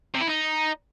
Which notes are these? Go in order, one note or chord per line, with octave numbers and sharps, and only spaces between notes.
C3
E4
D#4